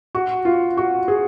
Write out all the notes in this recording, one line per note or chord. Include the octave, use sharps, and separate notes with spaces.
F#4
F4
F#4
G#4